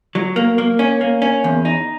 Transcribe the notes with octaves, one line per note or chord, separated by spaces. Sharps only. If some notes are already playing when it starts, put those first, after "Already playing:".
F#3
A#3
A#3
C#4
A#3
C#4
E2
D#4